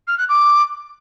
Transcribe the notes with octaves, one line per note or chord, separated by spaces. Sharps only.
F6
F#6
D6